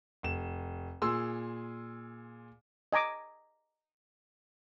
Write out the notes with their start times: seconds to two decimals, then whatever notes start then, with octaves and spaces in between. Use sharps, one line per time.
0.23 F1 E7
1.02 A#2 G#4 C6 E6
2.92 D#5 G#5 A#5 D6